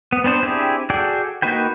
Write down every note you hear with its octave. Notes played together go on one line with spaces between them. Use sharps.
B3
B3 C4 D4 C5
C4 D4 E4 G4 G#4
F#4 G#4 A4 D5 G5
A#3 D#4 F#4 B4 G5